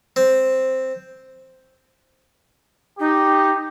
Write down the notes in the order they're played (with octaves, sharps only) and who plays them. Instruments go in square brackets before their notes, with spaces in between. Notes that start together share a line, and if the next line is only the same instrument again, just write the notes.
[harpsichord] C4
[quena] D#4 [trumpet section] G4